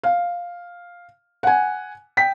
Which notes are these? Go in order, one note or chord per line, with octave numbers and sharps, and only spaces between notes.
F5
F#5 G#5
G5 B6